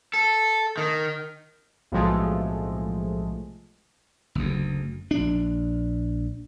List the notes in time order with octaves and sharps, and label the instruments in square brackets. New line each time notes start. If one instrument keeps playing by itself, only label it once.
[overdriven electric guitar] A4
D#3
[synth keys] B1 A2 C3 F3 G#3 A3
[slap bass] F#1 D2
A#1 D4